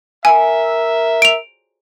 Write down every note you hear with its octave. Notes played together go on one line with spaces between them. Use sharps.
A#4 E5 G#5
D7 F7